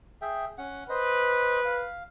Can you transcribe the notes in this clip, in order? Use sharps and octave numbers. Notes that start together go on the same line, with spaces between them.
G#4 E5 G5
C#4 F#5
B4 C5 D#5
F5